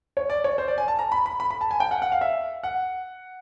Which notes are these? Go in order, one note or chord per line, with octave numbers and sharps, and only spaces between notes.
C#5
D5
C#5
C5
D5
G#5
A5
A#5
B5
B5
B5
B5
A5
G#5
G5
F#5
F#5
F5
E5
F#5